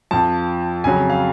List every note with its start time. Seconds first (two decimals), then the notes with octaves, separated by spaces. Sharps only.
0.11 F2 F3 A5
0.84 F2 C#3 F#3 G#5
1.10 F5